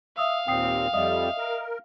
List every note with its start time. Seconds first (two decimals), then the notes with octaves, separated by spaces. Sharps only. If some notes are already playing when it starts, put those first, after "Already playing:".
0.17 E5 F5 D#6 E6
0.48 D#2 A#2 C4 G5 D#6 C7
0.94 F2 G3 D#5 E5 D#6
1.38 A#4